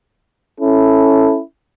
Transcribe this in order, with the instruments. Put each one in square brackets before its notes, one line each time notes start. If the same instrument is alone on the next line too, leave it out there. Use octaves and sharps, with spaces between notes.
[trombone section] C#4 E4 A4